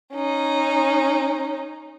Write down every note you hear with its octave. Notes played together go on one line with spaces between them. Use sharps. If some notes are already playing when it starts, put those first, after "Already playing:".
C#4 D#4